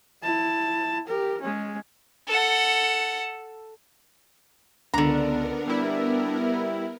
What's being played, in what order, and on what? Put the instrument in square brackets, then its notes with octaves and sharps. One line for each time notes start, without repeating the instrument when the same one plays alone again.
[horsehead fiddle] E4 A5
G4 A#4
G#3 C#4
[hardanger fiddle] A4 F#5
[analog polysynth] C#2 [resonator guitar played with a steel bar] D3 A#5 [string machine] B3 A#4 [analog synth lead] D4
[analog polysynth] G3 E4